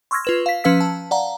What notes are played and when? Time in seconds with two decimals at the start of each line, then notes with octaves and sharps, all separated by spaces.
0.11 C6 C#6 E6 F6 G#6 A#6
0.25 F4 B4 E7
0.46 F5 B6
0.64 F3 C#4 B4 F5 E6 B6
0.81 A5
1.11 D5 F5 F#5 A#5